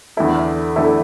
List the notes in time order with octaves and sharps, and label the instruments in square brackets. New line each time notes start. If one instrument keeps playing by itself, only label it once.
[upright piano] E2 D3 A3 E4 A4
E2 D3 A3 E4 A4